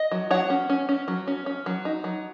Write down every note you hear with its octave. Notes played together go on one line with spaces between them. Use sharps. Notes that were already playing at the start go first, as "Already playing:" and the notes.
Already playing: D#5
F#3
F#3 C#5 F#5
C#4
C#4
C#4
F#3
C#4
C#4
F#3
D#4
F#3